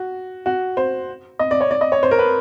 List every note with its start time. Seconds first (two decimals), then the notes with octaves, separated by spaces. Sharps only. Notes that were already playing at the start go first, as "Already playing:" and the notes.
Already playing: F#4
0.46 F#4
0.77 C5
1.39 D#5
1.51 D5
1.61 C#5
1.71 D5
1.81 D#5
1.92 C#5
2.03 C5
2.11 A#4
2.19 B4